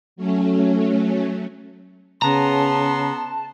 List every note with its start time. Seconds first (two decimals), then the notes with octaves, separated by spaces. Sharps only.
0.16 F#3 A3 C#4
2.22 C#3 B3 A5 A#5 C6